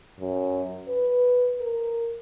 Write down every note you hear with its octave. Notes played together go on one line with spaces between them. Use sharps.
F#2
B4
A#4